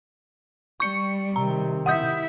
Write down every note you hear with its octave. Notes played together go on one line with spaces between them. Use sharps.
G3 C#6 C#7
C3 D#3 A#5
E4 E5 F#5 D#6 G6